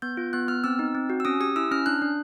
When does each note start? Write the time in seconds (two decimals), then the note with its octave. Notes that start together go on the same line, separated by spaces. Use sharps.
0.02 B3 G6
0.17 F4
0.33 B3 F#6
0.48 B3 F6
0.64 C4 E6
0.79 D#4
0.95 C4
1.10 F#4
1.20 E6
1.25 C#4 D#6
1.40 G4 D#6
1.56 E4 E6
1.71 C#4 F6
1.86 D4 F#6
2.02 D4